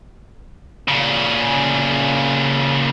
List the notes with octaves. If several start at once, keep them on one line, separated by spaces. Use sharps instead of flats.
A#2 C#3